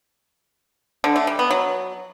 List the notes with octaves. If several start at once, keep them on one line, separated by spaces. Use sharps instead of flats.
D3
A3
G3
B3
F#3